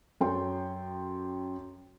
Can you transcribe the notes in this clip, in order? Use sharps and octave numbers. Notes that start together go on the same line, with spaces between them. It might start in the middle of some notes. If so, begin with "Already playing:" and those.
F#2 A4 C#5 G5 C6